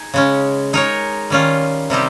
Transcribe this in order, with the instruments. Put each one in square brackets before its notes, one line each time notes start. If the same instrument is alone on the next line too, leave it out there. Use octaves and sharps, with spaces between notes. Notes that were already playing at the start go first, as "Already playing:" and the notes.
Already playing: [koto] D#4 G#4
C#3 G#3 C#4
G#3 D#4 A#4 C#5
D#3 G3 C#4 F4
C3 G3 C4 D#4 G4